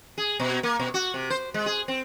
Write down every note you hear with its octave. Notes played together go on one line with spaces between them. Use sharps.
G#4
B2
A#3
B2
F#4
C3
C5
G#3
G#4
C4